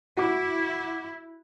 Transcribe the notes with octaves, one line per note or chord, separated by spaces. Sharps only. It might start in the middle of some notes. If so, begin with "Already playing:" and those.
E4 F#4 D6